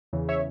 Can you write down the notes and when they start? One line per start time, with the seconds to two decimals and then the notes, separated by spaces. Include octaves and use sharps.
0.13 E2 C#3 E3
0.29 C#5 E5